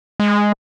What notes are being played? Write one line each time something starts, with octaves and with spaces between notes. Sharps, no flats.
G#3